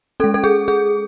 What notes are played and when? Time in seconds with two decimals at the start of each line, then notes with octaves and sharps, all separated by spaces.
0.20 C#4 A4
0.24 G#3
0.34 A4
0.44 G#4
0.68 G#4